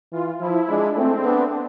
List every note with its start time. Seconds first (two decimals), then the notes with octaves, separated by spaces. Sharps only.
0.12 E3 F4
0.41 F3 E4
0.68 G#3 D4
0.96 A3 C4
1.24 B3 D4